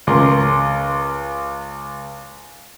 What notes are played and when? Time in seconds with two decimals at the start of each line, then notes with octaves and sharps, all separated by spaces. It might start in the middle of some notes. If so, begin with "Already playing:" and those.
0.07 C#2 A#4 C6